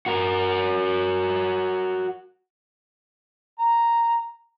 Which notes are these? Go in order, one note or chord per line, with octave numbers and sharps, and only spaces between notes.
F#4 A#4
A#5